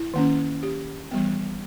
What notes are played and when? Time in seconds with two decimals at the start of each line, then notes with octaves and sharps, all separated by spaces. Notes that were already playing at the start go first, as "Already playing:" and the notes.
Already playing: E4
0.14 D#3 A#3 C#4
0.63 G4
1.11 E3 G3 B3